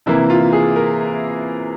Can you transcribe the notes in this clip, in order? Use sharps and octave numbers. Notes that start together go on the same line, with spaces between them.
C3 E3 A#3 E4
F4
G#4
A#4